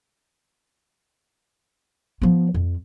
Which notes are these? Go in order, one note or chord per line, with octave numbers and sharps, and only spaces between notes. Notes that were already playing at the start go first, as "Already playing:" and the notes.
F3 B3
F2